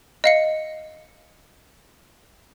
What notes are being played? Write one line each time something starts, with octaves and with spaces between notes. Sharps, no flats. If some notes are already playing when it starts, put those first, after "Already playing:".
D#5 F5 C#7